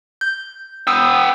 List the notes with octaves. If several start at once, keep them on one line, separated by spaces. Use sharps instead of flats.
G6
B3 G5 D#6 E6